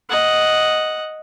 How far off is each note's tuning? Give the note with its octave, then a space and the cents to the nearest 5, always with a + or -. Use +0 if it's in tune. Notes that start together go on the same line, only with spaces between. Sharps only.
D#5 +0 F#5 +0